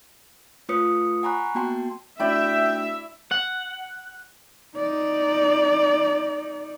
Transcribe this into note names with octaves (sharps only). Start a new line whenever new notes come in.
A3 F4 B4 C#5 D#6 C#7
F#5 G#5 A#5 B5 C#6 F#6
A#3 B3 F#4 G5 A5 C6
A3 D4 E4 F#4 D5 E5 G5
F#5
D#4 D5